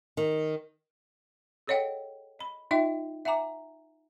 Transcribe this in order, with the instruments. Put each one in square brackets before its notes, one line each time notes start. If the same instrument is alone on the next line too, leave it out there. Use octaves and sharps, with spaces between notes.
[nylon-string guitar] D#3
[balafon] G#4 A4 C#5 D#5 F#5 G5
D#5 B5
D#4 F4 D#5 E5 G5
E5 F#5 G#5 A#5 D6